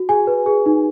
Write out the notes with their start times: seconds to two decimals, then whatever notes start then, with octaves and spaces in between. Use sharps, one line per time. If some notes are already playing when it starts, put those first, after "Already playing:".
Already playing: F#4
0.09 G#4 G#5
0.27 B4
0.46 G#4
0.66 D#4